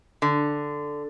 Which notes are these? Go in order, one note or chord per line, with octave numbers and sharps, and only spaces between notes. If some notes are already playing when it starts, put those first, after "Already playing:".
D3